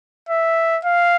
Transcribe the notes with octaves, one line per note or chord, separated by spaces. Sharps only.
E5
F5